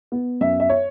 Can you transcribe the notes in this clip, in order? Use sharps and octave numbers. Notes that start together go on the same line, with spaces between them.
B3
F#2 E5
E5
C#5